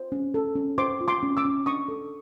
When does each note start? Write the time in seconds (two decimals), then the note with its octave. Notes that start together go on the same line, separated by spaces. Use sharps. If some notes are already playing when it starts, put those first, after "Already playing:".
Already playing: C5
0.12 C#4
0.34 A4
0.56 C#4
0.78 C5 C6 D6
1.01 F4
1.08 C6 D6
1.23 C#4
1.37 D6 E6
1.45 C#4
1.66 D4 C#6 D#6
1.88 A4